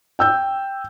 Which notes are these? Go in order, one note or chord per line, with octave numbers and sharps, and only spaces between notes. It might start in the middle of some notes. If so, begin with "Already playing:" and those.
G5 E6 G6